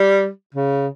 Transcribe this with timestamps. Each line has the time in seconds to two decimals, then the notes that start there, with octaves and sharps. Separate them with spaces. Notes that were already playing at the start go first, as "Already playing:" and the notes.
Already playing: G3
0.55 C#3